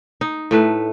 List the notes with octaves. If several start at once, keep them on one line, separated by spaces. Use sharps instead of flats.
D#4
A2 A3 B4